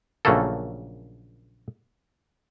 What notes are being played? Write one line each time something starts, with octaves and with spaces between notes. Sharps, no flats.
A#1 C#3 F#3 A3 A#3 A4